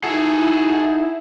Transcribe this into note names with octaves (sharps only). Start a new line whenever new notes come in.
D#4 E4 F#4 G#4 A4